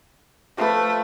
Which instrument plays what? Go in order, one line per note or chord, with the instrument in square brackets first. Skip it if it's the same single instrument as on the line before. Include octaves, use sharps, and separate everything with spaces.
[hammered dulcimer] F3 B4 [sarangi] A3